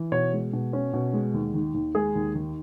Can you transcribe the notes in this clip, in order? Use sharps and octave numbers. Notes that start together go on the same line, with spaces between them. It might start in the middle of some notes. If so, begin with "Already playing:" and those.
Already playing: E3
B2 C#5
G#3
B2
C#4
B2
G#3
D#2
D#3
D#2
G#3 G#4
D#2
D#3